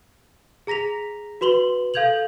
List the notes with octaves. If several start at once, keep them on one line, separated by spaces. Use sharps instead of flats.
G#4 A#5 A#6 B6 F7
F#4 B4 C6 F#7 G7
A4 F5 G6 G#6 F7 F#7